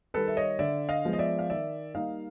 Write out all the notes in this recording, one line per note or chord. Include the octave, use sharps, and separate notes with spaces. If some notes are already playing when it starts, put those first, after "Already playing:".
D#3 G3 A4 B4
E5
C#5 D#5
D3 D5 E5
D#5 F5
F3 G#3 B3
D#5
D5 E5
F5
D#3 D5 E5
G3 A#3 D#4 D#5 F5